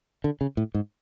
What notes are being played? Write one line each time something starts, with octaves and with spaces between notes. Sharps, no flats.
D3
C#3
A2
G#2